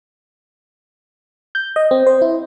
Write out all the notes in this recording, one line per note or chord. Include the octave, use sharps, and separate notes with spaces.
G6
D#5
C4
C5
E4